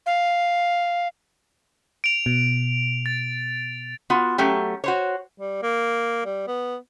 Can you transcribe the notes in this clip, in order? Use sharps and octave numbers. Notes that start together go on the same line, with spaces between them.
F5
D7 F7
B2
A6
B3 F4 F#4
F#3 A3 C#4 G4
F#4 C5 C#5
G3
A#3
G3
B3